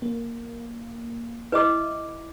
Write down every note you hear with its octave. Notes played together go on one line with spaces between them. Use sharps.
A#3
E4 B4 D#5 D6